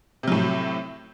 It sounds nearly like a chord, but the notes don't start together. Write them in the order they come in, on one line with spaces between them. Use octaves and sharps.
C3 F#3 A2